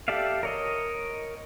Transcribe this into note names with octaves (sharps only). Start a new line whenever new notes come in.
G4 A4 D5 E5 F5
A#4 C#5 D#5